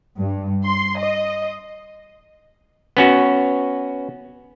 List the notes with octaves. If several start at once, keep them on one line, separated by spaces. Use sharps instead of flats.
G2
C6
D#5
B3 C#4 F#4